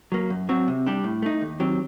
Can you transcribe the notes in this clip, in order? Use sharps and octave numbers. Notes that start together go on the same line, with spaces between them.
F#3 A#3
F#2
F#3 C4 F#4
C3
G3 D4 G4
A2
A3 D#4
D#2
D#3 F#3 C4 G4